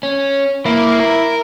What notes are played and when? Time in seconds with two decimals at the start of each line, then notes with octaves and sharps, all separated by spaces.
0.03 C#4
0.66 A#3 E4
1.00 A#4